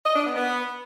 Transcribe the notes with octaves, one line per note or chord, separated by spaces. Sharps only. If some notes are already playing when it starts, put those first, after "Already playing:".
D#5
D4
B3
B3